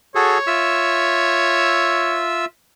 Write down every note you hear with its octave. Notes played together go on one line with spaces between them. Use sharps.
F#4 G#4 A4 C#5
F4 E5 E6